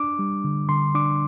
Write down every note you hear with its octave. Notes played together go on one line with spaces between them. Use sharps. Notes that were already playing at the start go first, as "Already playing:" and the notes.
Already playing: D4 D6
G3
D3
D3 C6
D4 D6